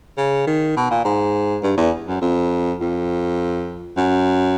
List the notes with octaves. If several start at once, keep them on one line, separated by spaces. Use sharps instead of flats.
C#3
D#3
B2
A#2
G#2
G2
E2
F#2
F2
F2
F#2